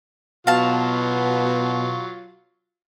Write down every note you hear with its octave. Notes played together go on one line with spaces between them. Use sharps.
B2 F#3 F4 F5 A5